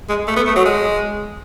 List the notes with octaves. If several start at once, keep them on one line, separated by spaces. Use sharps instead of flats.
G#3
A3
B3
A3
F#3
G#3